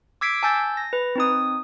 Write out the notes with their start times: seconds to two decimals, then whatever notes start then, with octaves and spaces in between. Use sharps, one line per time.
0.21 D6 E6 G#6 B6 C7 D7
0.43 G#5 A5 E6 G6 A6
0.77 A#6
0.93 B4
1.16 C4 D#4 D#6